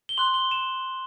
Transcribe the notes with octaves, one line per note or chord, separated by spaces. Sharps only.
G7
C6 F#6 F#7
G7
E7